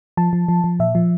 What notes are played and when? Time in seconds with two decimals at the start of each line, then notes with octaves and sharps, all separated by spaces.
0.17 F3 A5
0.33 F3
0.48 F3
0.64 F3
0.80 A#2 E5
0.95 F3